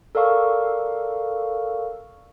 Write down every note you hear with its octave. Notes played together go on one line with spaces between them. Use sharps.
A4 A#4 D5 F5 C#6 E6